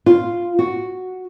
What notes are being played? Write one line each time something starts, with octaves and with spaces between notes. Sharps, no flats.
F4
F#4